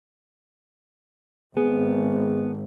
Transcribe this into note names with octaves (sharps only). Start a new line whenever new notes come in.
G#1 B3 G#4